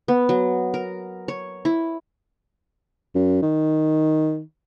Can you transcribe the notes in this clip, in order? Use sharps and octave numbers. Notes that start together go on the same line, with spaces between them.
B3
F#3
A#4
C#5
E4
F#2
D#3